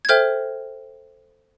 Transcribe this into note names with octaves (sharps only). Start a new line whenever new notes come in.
G#6
A4 C5 E5 G5 F6 G6